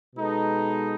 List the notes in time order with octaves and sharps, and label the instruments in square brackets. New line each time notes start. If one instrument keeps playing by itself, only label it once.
[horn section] B2 G#3 B3 D#4 A4